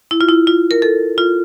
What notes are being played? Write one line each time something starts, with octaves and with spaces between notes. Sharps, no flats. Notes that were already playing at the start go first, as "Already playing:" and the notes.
E4
F4
E4
F4
A#4
A4
F4